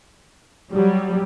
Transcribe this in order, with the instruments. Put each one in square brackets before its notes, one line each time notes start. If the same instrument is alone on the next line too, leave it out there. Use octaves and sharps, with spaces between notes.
[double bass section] F#3 [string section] G3